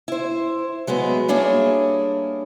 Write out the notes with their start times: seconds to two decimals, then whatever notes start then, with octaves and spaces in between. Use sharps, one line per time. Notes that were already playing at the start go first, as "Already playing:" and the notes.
0.08 E4 C5
0.87 F#3 G#3 A3 B3
1.28 G3 A#3 D4 E4 G#4 C#5